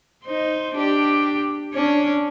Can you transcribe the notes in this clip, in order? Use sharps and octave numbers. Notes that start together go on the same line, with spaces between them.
D#4 C5
D4 G4
C#4 D4 C#5